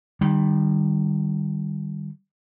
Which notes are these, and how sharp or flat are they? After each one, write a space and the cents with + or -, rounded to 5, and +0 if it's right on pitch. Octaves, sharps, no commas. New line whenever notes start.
D#3 -30 G3 +0